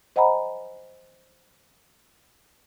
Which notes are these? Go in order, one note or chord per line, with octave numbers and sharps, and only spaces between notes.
C5 D#5 F#5 G#5 A#5 B5